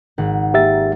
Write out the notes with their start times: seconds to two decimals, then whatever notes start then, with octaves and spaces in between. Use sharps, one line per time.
0.18 G#1 F#5
0.54 A#3 G4 E5 A6